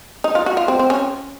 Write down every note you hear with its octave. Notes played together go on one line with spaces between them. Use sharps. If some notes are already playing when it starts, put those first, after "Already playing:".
D#4
F4
F#4
F4
C4
C4
C#4